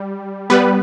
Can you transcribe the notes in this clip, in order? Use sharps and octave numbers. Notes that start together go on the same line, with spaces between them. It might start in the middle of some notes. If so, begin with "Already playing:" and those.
Already playing: G3
G3 B3 B4